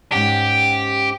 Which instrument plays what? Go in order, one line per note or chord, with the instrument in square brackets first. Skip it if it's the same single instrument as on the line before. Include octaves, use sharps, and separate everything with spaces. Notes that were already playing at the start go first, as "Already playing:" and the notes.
[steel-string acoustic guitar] G#2 C#4 F#5 [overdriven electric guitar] G4